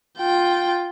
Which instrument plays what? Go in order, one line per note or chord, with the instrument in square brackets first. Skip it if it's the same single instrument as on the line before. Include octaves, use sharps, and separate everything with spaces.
[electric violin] F4 G5